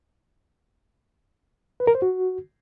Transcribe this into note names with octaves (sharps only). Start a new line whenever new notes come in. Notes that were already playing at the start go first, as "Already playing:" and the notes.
B4
A#4
C5
F#4